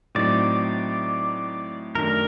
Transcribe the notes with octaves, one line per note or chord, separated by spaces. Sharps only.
A2 F#3 C4 D#4 D5
F#2 D#3 A3 D4 A#4